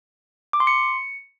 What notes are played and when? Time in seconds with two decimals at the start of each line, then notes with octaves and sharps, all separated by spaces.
0.53 D6
0.60 C6
0.67 C#7